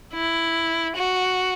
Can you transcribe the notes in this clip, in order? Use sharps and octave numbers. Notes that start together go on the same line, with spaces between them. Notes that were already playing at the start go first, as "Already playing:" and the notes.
E4
F#4